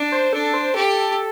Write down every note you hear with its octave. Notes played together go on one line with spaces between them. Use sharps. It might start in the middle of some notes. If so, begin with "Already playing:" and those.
Already playing: D4
C5
D4 A4
C5
G4 A4